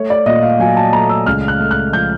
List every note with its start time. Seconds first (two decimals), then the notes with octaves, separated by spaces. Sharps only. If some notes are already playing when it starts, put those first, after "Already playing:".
Already playing: A3 C#5
0.10 D5
0.26 A#2 D#5
0.42 F5
0.59 F#3 G#5
0.77 A5
0.93 A3 A#5
1.10 E6
1.26 C#2 F6
1.48 F#6
1.59 A3
1.71 F#6
1.93 F3 G6